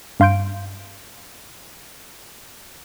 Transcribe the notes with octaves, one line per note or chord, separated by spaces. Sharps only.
G2 F5 C6 G6 D7